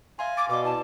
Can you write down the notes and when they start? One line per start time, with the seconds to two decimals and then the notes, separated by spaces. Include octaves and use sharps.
0.19 E5 F5 G#5 C6
0.37 D6 A6
0.49 B2 B4 D5 D6
0.64 E4 A5